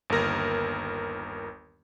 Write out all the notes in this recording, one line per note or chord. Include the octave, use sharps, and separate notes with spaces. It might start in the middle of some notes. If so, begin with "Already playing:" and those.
G1 D#2 A#4 A#6